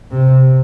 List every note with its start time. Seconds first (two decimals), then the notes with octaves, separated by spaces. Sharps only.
0.11 C3